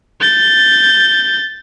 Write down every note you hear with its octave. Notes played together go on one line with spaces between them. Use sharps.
G6 A6